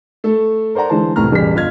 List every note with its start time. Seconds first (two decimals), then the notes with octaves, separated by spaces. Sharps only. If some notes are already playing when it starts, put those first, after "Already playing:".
0.24 A3 A4
0.75 A#4 C5 D5 F#5 A#5
0.90 D3 E3 G#3 E4 C5 A5
1.16 C2 A2 E3 A3 A#5 F6
1.31 E1 A1 G3 G#4 B6
1.54 G1 F4 D#5 F6 G#6